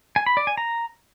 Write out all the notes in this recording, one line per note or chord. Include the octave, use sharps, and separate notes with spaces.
G#5
B5
D5
G#5
A#5